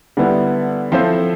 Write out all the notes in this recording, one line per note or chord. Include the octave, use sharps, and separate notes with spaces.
D3 G3 B3 E4
F3 C4 E4 A4 C5